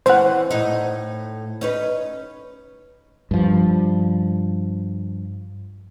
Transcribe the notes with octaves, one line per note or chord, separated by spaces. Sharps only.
E3 C4 C#4 C5 F#5
A2 D#4
C#4 D#4 B4
G2 F3